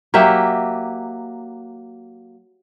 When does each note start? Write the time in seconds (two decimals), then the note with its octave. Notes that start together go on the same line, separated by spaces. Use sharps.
0.14 F#3 A#3 G4 E5